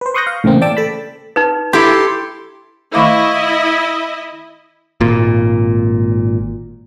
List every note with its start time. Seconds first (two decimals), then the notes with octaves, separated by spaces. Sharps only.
0.01 B4 C5
0.14 C6 C#6 D#6 F#6 G6 A#6
0.27 F5
0.44 A2 C#3 E3 A#3 C4
0.62 D5 G5 A5 D6 E6
0.77 A4 A5 B5
1.36 D#4 B4
1.73 E4 G4 A4 A5 A#5 C6
2.95 D#3 A3 E4 D#5 F5 B5 C#6 D6
5.01 G#1 A#2